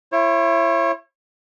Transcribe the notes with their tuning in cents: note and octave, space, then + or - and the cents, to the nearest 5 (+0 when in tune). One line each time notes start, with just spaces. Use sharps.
E4 +30 C#5 -30